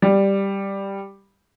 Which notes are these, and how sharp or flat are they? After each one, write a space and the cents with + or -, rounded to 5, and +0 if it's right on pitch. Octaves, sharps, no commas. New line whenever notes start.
G3 +5